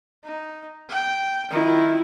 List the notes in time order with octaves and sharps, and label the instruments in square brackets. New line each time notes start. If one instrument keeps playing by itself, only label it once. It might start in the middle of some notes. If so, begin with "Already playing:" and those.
[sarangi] D#4
G5
[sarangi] D#3 [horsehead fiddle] E4 F4